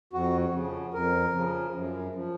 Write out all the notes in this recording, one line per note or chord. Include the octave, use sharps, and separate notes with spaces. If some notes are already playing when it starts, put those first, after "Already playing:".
F2 F#4
C#3 F3
F2 A#4
C#3 F3
F#2
F3